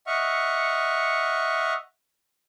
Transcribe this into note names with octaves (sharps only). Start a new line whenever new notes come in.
D#5 E5 F#5 C#6 F6